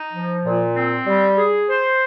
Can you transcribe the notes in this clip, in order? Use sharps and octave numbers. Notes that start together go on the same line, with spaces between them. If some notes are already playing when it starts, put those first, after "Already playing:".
Already playing: D#4
F3
A#2
C4
G3
G#4
C5